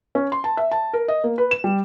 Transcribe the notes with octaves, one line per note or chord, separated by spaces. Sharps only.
C#4
C6
A5
E5
A5
A#4
D#5
A#3
B4
E7
G3